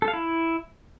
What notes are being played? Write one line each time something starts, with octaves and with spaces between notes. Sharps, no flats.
A4
F5
E4